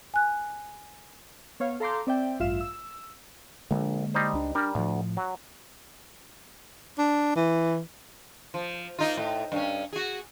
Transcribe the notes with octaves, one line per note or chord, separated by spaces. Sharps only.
G#5 F#6
B3 C#5 F5
A4 F5 A#5 C6 D6 G6
C4 D5 E5 G5
A1 G2 F4 E5 F5 E7
E6
A#1 D3 G#3 A#3
G3 D#4 C5
C#2 D4
G3 D4 A#4
D2 A2 F3
F#3
D4
E3
F3
A#3 D#4 F4
A2
G2 C#4
F#4 G#4